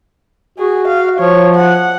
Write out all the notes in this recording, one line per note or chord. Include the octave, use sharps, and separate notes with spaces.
F#4 G#4
F5
F3 C#5
F#5